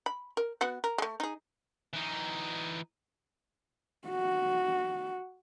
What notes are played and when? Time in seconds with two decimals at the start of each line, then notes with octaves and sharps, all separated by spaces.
0.06 B5
0.37 A#4
0.61 B3 F#4 F#5
0.84 A#4
0.98 G#3 A3
1.20 D#4 G#4
1.93 E3 D#4
4.08 F#4